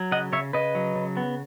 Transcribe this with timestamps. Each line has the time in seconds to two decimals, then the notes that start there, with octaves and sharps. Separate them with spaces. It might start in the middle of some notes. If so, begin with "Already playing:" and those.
Already playing: F#3
0.12 C#3 D#5 F#5
0.32 C#3 C#5 E5
0.53 C#3 B4 D#5
0.75 F#3
0.96 C#3
1.17 B3